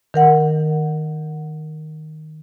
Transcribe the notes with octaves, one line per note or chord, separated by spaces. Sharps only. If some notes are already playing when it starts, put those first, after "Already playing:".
D#3 A#4 F#5